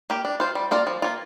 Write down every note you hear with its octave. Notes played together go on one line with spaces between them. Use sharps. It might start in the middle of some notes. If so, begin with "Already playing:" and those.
A#3 G4
D4
F4 C5
G3
A#3 F4 A#4 D5
F3
A#3 F4